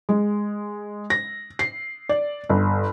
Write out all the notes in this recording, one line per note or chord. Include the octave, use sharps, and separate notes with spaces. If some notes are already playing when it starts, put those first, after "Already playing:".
G#3
A#6
C7
D5
G1